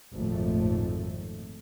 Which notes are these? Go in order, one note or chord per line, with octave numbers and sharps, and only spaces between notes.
G#1 F2 A#2 F3 A3